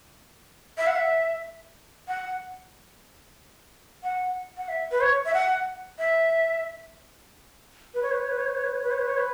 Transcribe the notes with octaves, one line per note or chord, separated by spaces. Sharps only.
E5
F#5
E5
F#5
F#5
F#5
E5
B4
C#5
E5
F#5
E5
B4
C#5
B4
C#5
B4
C#5
B4
C#5
B4
C#5
B4
C#5
B4
C#5
B4